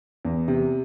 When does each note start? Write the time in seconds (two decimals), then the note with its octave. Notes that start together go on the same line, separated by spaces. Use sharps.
0.25 E2
0.48 C3